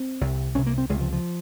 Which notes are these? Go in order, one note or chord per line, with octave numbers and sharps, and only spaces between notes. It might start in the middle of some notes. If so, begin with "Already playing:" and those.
Already playing: C4
C2 C3
C2 C3 C#4
A#3
C4
C#2 C3 G#3
F3
F3